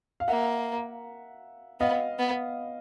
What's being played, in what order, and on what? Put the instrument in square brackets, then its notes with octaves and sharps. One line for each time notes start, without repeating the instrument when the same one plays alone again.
[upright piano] F5
[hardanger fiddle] A#3 [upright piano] E5 F#5
[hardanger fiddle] B3 [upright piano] D#5 F5
[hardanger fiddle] B3